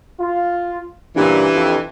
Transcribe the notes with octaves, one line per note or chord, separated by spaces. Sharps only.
F4
G2 A#2 C#3 E3 D4 G4
F2